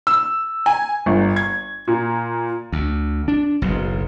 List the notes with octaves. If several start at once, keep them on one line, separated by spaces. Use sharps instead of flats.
E6
G#5
G1
G#6
A#2
D2
D4
F#1 B1